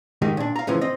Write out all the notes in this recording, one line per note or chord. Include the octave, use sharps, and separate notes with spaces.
G#2 D#3 D#4 G4
A#2 D4
F5 A#5
A2 C#3 E3 F3
C4 D#5